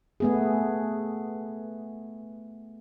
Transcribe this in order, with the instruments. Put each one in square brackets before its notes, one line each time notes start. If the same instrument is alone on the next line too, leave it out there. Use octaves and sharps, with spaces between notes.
[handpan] A3 B3 G#4